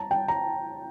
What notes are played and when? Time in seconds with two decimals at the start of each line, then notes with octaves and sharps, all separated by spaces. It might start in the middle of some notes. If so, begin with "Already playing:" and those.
Already playing: A5 A#5
0.11 G5
0.28 A#5